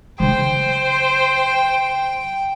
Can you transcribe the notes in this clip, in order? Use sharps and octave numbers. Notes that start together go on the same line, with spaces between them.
C#3 F#3 C5 G5